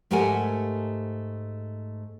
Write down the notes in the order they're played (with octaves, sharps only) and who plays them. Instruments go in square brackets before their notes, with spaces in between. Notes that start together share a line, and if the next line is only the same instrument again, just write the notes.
[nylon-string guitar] G#2 A3 G4 A#4 F#5 G#5